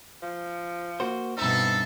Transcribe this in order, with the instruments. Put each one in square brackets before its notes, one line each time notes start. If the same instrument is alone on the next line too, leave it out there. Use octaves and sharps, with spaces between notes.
[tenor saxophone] F3
[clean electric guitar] A#3 F#4 C5
[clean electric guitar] G2 D#4 [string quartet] B2 E5 [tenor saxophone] C4 [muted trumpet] A4